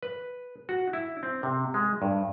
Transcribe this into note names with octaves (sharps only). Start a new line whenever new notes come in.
B4
F#4
E4
C4
C3
G#3
G2